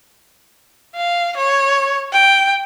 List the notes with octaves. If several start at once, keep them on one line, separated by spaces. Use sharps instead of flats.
F5
C#5
G5